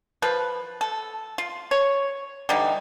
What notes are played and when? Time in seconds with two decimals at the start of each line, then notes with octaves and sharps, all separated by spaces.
0.22 F3 B4
0.81 A4
1.38 F4
1.71 C#5
2.49 D3 E3 G3 D#4